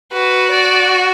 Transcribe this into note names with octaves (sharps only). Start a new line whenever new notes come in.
F#4 B4
D5